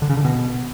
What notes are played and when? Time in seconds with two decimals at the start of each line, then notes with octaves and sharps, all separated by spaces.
0.02 D3
0.10 C#3
0.17 D3
0.25 B2